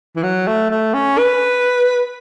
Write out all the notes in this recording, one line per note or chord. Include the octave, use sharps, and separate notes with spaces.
E3
F#3
A3
A3
C#4
B4